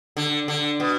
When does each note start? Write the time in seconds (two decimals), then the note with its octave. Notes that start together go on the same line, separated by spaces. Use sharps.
0.17 D3
0.48 D3
0.80 B2